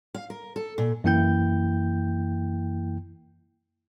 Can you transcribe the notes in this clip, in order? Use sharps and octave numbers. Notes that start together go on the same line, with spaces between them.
F5
A#4
A4
A#2
F#2 E3 A#3 E4 G5 G6